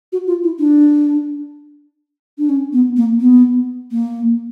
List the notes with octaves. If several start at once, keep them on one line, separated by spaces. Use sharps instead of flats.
F#4
F4
E4
D4
D4
C#4
B3
A#3
B3
A#3